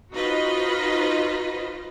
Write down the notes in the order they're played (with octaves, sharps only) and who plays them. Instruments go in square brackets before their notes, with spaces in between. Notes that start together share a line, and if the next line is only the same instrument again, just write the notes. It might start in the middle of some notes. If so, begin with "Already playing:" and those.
[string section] D#4 F4 F#4 B4 C5 D#5